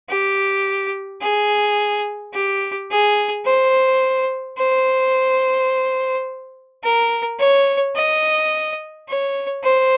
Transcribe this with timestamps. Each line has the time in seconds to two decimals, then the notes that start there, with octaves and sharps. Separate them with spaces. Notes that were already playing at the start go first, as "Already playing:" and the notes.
0.09 G4
1.21 G#4
2.34 G4
2.91 G#4
3.46 C5
4.58 C5
6.84 A#4
7.39 C#5
7.95 D#5
9.08 C#5
9.64 C5